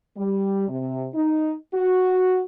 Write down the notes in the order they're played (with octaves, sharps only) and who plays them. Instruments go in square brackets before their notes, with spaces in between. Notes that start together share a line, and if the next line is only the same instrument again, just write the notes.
[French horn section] G3
C3
D#4
F#4